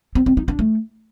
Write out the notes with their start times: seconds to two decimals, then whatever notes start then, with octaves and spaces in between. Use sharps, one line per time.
0.15 C4
0.26 C4
0.37 D#4
0.48 D4
0.59 A3